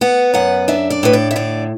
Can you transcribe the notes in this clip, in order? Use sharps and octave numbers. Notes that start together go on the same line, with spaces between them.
B3 F#5
F#2 F#5
D4 E5
D5
A2 B4
D5
E5
D3 D5